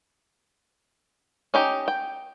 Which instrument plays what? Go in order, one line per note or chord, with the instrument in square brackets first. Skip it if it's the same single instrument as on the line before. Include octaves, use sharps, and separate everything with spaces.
[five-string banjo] C#4 D#4 G4
G5